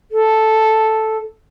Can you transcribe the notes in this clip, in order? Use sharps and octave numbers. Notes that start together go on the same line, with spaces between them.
A4